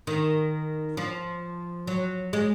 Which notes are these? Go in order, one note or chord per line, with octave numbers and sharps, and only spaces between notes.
D#3
F3
F#3
G#3